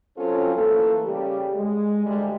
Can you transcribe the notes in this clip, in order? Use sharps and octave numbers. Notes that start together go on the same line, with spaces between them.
F#3 C4 C#4 F4 A4
E3 A3 A#3 A4
C#3 G3 G4
G#3
D2 G3 G#3